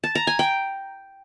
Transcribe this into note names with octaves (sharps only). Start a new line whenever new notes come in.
A5
A#5
G#5
G5